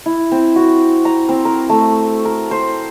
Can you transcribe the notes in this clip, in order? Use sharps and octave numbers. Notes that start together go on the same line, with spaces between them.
E4
C4
F#4
A#5
C4
A#4
A3
A#4
C5